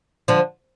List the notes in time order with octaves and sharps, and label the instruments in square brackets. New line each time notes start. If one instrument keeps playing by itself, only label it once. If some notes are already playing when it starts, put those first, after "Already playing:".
[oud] D3 F3